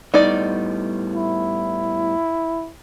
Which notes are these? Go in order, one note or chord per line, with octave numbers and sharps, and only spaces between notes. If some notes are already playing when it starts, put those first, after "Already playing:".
A2 G3 B3 D#4 D5
E4